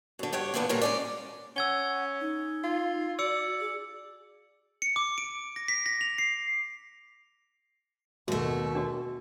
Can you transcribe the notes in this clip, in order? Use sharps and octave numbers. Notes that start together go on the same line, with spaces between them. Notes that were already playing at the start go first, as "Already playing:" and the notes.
F#2 D3
G2 G4 C#5 F#5
E2 A#2 D3 B3 D4
A#2 D3 G3 A#4 C#5
G#3 C#4 D5
C#4 F#5 E6 G#6 G7
D#4
F4
F#4 D5 E6 C#7
G#4
C#7
D6
D7
A#6
B6
A#6
F7
C7
D#2 B2 A3 F#4
D4 F#4